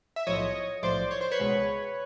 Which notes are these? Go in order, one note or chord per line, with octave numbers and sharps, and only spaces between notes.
E5
B1 A2 F3 C#5 D#5
B1 A2 F3 C5 D5
C#5
C5
B4 C#5
C#2 B2 G#3